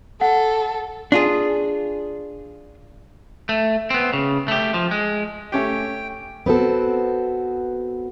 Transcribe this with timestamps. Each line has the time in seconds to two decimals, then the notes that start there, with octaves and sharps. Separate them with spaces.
0.21 A4 F#5
1.12 D4 F4 G#4
3.49 A3
3.90 B3 C4
4.13 C#3
4.48 A3 G4
4.74 F3
4.91 G#3
5.52 A3 C#4 G4 G5
6.46 B3 C4 F#4 A4